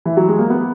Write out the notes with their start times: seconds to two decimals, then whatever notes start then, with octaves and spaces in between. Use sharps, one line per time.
0.06 E3
0.17 F#3
0.29 G#3
0.39 A#3
0.50 B3